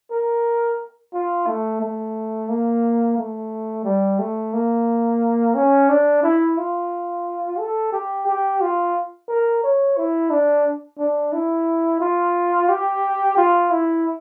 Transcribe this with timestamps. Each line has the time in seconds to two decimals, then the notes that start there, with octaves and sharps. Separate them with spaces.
0.11 A#4
1.13 F4
1.47 A3
1.81 A3
2.49 A#3
3.18 A3
3.85 G3
4.19 A3
4.54 A#3
5.55 C#4
5.89 D4
6.23 E4
6.57 F4
7.58 A4
7.92 G4
8.27 G4
8.61 F4
9.28 A#4
9.63 C#5
9.97 E4
10.30 D4
10.98 D4
11.32 E4
12.00 F4
12.69 G4
13.37 F4
13.71 E4